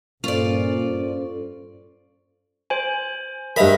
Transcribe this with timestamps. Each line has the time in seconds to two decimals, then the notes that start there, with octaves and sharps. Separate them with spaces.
0.24 G2 A#2 C#4 F4 A4 C5 D5
2.70 C5 G#5
3.56 G2 A#4 D#5 E5 B5